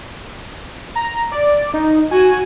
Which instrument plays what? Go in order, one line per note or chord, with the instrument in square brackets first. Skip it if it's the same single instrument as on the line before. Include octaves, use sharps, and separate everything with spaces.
[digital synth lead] A#5
D5
D#4
[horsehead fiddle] F#4 [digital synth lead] G#5